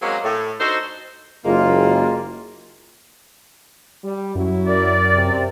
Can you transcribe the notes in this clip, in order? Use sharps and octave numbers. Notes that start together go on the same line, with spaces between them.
F#3 G#3 A#3 C4 C#4 G#4
A2
D4 D#4 F#4 A4 C5
F#1 G#3 A#3 F4
G3
F#2 F#3 E4 F#4
A#4 D5
C3